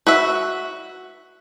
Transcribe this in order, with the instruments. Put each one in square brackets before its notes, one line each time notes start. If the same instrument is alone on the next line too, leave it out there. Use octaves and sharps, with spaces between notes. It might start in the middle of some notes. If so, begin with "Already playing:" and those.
[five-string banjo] F#4 B4 E5